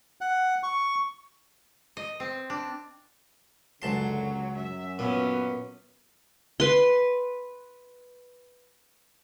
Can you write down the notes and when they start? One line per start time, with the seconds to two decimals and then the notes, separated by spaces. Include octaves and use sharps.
0.21 F#5
0.63 C#6
1.97 D#5
2.20 C4
2.50 D4
3.82 C#2 F#2 D3 F#3 A5 C6
4.56 F#2 E5
4.99 A#2 B3 C#4
6.60 B4 C6